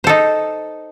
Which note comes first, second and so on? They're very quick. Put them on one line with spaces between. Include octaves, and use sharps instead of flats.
C5 A4 D#4